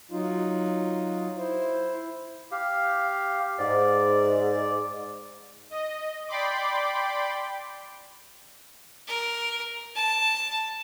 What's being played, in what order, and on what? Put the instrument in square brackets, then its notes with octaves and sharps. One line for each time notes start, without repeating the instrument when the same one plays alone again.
[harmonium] F#3 D#4 F4
E4 C5
[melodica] G4 F5
[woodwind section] G#2 [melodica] D5
[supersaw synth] D#5
D5 G5 B5 C6 D6
[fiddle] A#4
A5